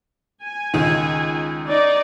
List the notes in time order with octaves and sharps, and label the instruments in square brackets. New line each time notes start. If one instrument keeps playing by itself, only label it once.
[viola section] G#5
[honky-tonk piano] C#2 D#3
[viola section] D#4 D5